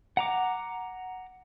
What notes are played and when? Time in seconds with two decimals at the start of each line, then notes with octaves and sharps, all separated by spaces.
0.17 F#5 A#5 D6